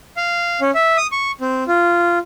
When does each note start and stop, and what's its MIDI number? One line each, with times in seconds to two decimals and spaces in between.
0.17 0.60 77
0.61 0.71 61
0.75 0.97 76
0.97 1.07 87
1.12 1.32 85
1.41 1.64 60
1.68 2.19 65